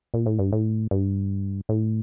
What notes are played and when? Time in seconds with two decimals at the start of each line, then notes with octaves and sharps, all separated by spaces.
0.14 A#2
0.26 A2
0.39 G2
0.52 A2
0.91 G2
1.69 A2